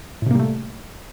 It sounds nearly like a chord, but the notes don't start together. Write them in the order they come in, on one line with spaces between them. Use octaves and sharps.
A2 C3 A#3 G3 A3